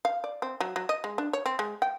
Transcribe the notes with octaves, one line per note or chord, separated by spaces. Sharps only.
F5
D5
C4
F#3
F#3
D#5
G#3
D4
C#5
C4
G#3
G5